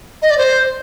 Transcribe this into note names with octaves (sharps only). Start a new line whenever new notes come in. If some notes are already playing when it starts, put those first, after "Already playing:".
D#5
D5
C5